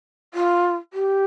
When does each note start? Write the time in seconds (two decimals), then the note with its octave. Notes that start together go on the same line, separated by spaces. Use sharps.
0.34 F4
0.93 G4